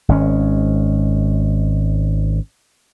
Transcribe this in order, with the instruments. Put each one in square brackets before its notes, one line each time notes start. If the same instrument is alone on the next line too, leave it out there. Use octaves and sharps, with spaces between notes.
[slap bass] G#1 G#3 C#4